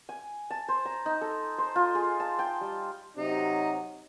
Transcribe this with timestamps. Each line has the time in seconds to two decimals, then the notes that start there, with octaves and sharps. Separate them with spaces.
0.09 G#5
0.50 A5
0.68 C5
0.85 A#5
1.06 D#4
1.21 A4
1.58 C5
1.76 F4
1.95 G#4
2.20 A5
2.39 G5
2.61 G3
3.17 C3 F#3 D#4